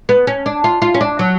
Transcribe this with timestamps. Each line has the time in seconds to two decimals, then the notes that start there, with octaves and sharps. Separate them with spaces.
0.09 B3
0.27 C#4
0.46 D4
0.64 F4
0.82 F4
0.94 C#4
1.01 D4
1.19 F#3